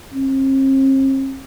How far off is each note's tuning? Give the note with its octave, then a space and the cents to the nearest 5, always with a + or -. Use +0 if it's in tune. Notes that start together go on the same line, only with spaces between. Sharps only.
C4 +45